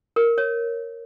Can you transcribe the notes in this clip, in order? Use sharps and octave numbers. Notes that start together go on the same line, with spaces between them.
A#4
C#5